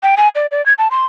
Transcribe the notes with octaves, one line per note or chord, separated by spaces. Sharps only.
G5
G#5
D5
D5
G#6
A5
C6